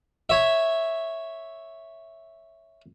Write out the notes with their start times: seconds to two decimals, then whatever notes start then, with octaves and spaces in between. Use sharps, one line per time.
0.29 C#5 E5